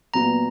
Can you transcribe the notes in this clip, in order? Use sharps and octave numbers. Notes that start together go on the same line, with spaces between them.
A#2 F#3 B3 A#5